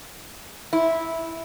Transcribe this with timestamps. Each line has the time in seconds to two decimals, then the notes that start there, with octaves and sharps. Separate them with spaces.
0.73 E4